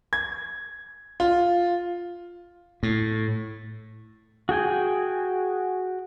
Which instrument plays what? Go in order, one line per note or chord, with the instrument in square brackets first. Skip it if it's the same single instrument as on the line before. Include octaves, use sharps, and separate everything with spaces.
[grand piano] G#6
F4
[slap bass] A2
[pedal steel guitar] F#4 G#4 G5 G#5